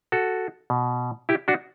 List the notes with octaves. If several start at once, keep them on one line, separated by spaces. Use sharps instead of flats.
F#4 A4
B2
E4 G4
D4 F#4